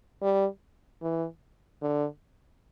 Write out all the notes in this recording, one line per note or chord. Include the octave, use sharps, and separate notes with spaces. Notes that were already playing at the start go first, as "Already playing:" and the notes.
G3
E3
D3